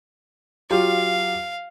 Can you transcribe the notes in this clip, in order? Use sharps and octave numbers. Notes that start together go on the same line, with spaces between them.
F#3 F4 G4 F5